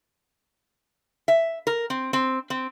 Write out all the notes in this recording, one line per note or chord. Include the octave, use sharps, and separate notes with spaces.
E5
A#4
C4
C4
C4